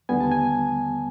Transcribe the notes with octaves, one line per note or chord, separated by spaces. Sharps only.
D#2 D3 G3 B3 G#5
A5
G#5